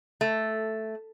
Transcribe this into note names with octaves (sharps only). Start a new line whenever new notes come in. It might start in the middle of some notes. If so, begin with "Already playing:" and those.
A3